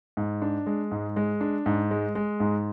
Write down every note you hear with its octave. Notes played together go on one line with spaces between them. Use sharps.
G#2
D4
G#3
G#2
G#3
D4
G#2
G#3
G#3
G#2